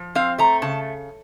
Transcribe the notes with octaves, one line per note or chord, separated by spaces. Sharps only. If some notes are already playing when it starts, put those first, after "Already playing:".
Already playing: F3
C4 F5
A3 A#5
C#3 A5